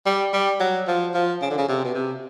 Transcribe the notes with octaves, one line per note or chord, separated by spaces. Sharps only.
G3
G3
F#3
F3
F3
C#3
D3
C#3
C3
B2
C3